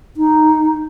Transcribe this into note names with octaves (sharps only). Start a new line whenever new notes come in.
D#4